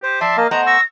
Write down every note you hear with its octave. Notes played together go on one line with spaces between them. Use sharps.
G4 C5
F3 D5 E5 A5 C6
A#3 D#5 F5
A3 B3 C5 D#5 F#5 A#5
C#6 E6 A#6